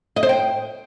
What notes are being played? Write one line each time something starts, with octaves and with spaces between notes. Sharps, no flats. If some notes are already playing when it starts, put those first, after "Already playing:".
D#5
C5
G5